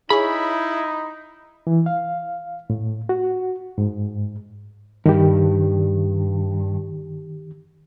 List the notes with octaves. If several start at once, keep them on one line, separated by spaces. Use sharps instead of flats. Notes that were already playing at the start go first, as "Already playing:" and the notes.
D#4 E4 G#4 C#5 B5
E3
F5
A2
F#4
G#2
G2 D#3 G4